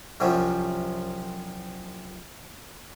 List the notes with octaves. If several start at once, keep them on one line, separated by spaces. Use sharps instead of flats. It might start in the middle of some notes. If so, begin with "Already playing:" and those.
C2 F#2 C3 F3 F#3